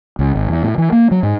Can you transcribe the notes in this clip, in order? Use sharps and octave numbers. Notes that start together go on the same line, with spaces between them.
C#2
G#1
E2
A2
E3
A#3
F#3
G#2